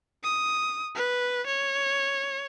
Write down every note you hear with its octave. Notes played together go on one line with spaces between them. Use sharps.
D#6
B4
C#5